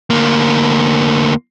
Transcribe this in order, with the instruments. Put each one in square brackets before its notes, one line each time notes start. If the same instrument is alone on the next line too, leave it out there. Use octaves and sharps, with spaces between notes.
[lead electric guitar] D2 A#3